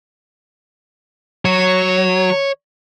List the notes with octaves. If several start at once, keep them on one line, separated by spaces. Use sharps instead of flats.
F#3 C#5